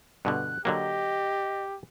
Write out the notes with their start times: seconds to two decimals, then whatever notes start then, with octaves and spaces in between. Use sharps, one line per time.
0.25 G2 B2 D3 F#6
0.65 D3 F#3 A#3 G4 D#5